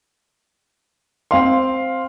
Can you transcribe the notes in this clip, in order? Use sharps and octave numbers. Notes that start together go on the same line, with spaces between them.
C4 F5 C6